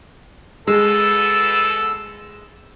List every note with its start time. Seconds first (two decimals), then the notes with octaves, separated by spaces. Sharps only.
0.67 B2 G#3 A4 E6